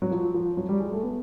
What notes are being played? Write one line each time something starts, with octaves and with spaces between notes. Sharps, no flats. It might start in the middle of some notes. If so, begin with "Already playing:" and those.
F#3
F3
F3
F#3
G3
G#3
A3
B3